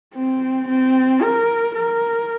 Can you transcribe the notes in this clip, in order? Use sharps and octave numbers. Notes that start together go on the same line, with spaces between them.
C4
C4
A#4
A#4